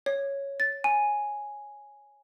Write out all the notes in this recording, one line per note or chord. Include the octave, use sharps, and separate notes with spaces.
C#5
A6
G#5